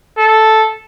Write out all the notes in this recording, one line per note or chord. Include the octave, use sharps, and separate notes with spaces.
A4